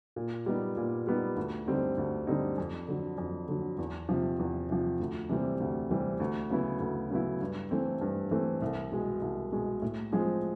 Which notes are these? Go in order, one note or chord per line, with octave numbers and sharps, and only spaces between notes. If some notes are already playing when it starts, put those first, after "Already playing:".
A#2
G3 B3 D#4
A#2
G3 B3 D#4
D2
D3 G3 C4 D#4
D2
D3 G3 C4 D#4
F2
D3 F#3
F2
D3 F#3
E2
C3 F3
E2
C3 F3
D2
C3 E3 G3 C4
D2
C3 E3 G3 C4
D2
C#3 F#3 B3 E4
D2
C#3 F#3 B3 E4
G2
E3 A3 C4
G2
E3 A3 C4
C2
B2 G#3
C2
B2 G#3
A2
F3 G#3 C4